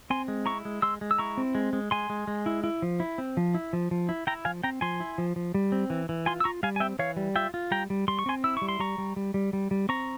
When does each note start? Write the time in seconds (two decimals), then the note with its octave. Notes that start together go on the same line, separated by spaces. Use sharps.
0.10 C4 G#5 C6
0.28 G#3
0.46 E4 A#5 C#6
0.65 G#3
0.82 G#3 C6 E6
1.01 G#3
1.11 E6
1.19 E4 A#5 C#6
1.37 C4
1.55 G#3
1.73 G#3
1.91 G#3 G#5 C6
2.10 G#3
2.27 G#3
2.46 E4
2.64 E4
2.82 F3
3.00 E4
3.18 C4
3.37 F3
3.54 E4
3.73 F3
3.91 F3
4.09 E4
4.27 E4 G5 A#5
4.45 F3 F5 G#5
4.64 C4 G5 A#5
4.81 F3 G#5 C6
5.00 E4
5.18 F3
5.36 F3
5.54 G3
5.72 C4
5.90 E3
6.09 E3
6.26 F4 G#5 C6
6.40 E6
6.44 F4 A#5 C#6
6.63 G3 F5 G#5
6.76 G#5
6.80 C4 E5 G5
6.99 E3 C#5 F5
7.17 G3
7.35 F4 E5 G5
7.54 F4
7.71 G3 G5 A#5
7.90 G3
8.08 G3 C6
8.19 C#6
8.26 C4 G#5 C6
8.44 E4 E6
8.57 G3 C#6
8.69 C6
8.80 G3 A#5 C#6
8.98 G3
9.16 G3
9.34 G3
9.53 G3
9.71 G3
9.89 C4 A#5 C#6